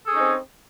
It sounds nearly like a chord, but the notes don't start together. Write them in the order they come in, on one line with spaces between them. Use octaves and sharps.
A4 G#4 C#4 D#4 C4